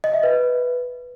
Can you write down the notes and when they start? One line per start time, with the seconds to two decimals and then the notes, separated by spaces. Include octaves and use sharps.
0.04 D#5
0.14 E5
0.23 B4